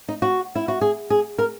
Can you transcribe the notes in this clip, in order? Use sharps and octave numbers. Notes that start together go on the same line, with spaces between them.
D#4
F#4
E4
F#4
G#4
G#4
A#4